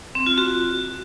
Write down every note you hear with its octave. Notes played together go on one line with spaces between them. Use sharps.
C4
F4
F#4